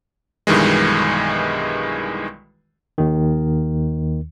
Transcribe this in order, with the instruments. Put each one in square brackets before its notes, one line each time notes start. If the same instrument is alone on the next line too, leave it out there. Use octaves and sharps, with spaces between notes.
[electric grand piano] B1 G2 D#3 E3 G#3
[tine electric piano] D#2 D#3